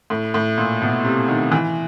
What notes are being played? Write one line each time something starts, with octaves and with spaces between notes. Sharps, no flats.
A2
A2
A#2
B2
C3
D#3
E3